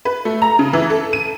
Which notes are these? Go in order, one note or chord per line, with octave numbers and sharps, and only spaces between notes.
B4
A3
A#5
C#3
E3
A4
D#7